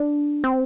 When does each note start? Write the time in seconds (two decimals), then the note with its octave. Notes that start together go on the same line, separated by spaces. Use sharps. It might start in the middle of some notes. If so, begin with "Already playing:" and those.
Already playing: D4
0.44 C4